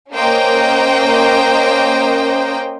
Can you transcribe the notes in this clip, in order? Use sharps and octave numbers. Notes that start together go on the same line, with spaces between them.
A#3 C#4 A#4 C5 D#5 G5